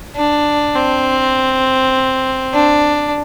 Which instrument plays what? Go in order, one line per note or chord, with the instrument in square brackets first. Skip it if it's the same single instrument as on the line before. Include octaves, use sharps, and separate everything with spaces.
[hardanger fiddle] D4
C4
D4